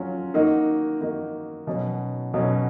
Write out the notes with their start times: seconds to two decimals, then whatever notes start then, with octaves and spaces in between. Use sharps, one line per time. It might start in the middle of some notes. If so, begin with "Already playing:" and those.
Already playing: F#3 C#4 F4
0.34 D#3 A#3 D#4 F#4
1.01 D#3 A#3 D#4 F#4
1.67 B2 F#3 C#4
2.34 B2 F#3 C#4